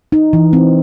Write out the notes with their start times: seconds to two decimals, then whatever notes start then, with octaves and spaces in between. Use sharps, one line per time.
0.12 D#4
0.33 E3
0.53 C4